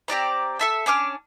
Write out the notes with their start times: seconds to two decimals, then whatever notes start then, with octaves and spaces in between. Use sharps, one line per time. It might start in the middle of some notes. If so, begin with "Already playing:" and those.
0.08 C4 G4 D5 A#5
0.59 A4 E5 A5
0.86 C#4 D4 D6 F6